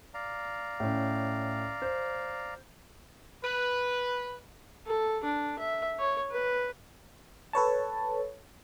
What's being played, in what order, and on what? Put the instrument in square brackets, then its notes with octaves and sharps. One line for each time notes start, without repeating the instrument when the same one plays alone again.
[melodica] D5 F5 A#5
[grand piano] A2 C#4
C5
[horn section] B4
[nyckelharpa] A4
D4
E5
C#5
B4
[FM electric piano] A4 B4 C#5 A5